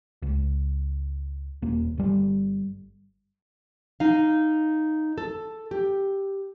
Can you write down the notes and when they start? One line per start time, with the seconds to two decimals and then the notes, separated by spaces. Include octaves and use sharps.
0.22 C#2
1.62 D#1 A#3
1.97 G1 G3
4.00 D#4 F5
5.18 A4
5.71 G4